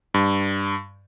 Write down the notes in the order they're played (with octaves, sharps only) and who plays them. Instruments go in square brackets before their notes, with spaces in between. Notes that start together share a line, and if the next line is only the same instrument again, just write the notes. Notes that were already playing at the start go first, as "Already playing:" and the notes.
[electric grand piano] G2